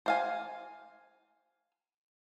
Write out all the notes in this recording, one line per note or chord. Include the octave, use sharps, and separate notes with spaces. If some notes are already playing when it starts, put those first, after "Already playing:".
C5 F5 G#5